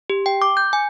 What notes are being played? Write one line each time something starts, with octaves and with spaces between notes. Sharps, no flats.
G4
G5
D6
G6
G#5